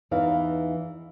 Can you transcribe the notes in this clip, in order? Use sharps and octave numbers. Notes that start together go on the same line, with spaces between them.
E2 E3 D#4 F5